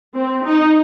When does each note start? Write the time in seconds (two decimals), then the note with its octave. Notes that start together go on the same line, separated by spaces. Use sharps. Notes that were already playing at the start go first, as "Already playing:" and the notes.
0.14 C4
0.44 D#4